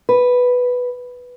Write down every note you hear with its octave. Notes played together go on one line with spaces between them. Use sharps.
B4